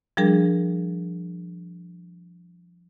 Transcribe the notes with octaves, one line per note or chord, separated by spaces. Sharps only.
F3 G3 D4 G#4 A#4